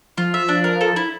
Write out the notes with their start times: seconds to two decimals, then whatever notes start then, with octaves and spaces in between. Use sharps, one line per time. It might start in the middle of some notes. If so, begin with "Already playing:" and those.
0.18 F3 F4
0.34 E5
0.48 D4
0.64 A#4
0.81 A4
0.96 E4